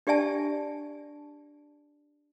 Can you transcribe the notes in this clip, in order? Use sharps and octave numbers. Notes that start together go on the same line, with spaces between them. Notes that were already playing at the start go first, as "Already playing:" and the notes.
D4 G4 D5 E5 G#5 A5